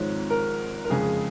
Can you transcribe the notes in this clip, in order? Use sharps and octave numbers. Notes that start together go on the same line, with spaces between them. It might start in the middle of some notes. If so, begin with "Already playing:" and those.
Already playing: G#1 G#2 F3 C4 C#5
A#4
A#4
F#1 F2 C#3 G#3 G#4